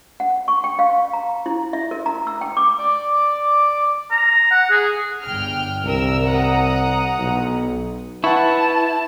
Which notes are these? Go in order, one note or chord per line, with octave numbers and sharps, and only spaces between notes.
F#5
C#6
G5
F5
A#5
E4
E5
A#4
A#5
E6
G5
D6
D5 D6
A#5
F#5
G#4
G1 G5 F6
C2 A#4 E6
F#5 A#5 D#6
B1
E4 B4 F#5 A5 C#6